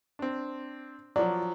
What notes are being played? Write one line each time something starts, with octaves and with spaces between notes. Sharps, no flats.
C4 D4
F3 F#3 D5